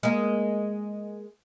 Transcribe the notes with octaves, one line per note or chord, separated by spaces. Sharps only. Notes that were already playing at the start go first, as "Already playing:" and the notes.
G#3 A#3